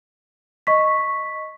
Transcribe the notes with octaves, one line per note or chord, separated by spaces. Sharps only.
D#5 C#6 B6